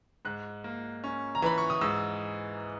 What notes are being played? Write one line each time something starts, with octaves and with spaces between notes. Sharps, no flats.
G#2 F#6
A#3
C#4
A#5
E3 B5
C#6
D#6
G#2 E6